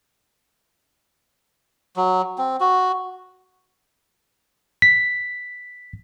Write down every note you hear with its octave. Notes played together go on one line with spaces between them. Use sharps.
F#3
C4
F#4
B6